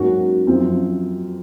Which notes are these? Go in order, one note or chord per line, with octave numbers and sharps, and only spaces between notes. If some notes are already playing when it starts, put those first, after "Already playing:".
Already playing: G#2 F#3 A#3 C#4 F#4
F#2 F3 C4